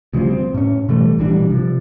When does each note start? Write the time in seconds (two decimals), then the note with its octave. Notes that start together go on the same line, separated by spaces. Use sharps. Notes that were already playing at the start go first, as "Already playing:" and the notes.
0.13 D2 C#3 F3 G3
0.30 C4
0.54 A2 C#4
0.89 B2 E3 G3 A3
1.19 A#1 E3 G3 D4
1.50 C3 F3